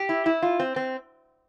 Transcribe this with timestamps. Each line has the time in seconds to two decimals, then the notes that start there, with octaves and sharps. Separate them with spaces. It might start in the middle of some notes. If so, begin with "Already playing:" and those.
Already playing: G4
0.09 E4
0.26 E4
0.42 F4
0.59 C4
0.76 C4